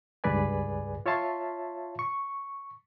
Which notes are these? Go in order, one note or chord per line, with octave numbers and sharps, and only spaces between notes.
C#2 G2 G#4 B4 D5 G#5
F4 C#5 E5 F5 A5 C6
C#6